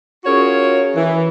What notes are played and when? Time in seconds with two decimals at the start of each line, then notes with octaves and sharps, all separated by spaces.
0.25 C#4 F4 F#4 G#4 A#4 C#5
0.96 E3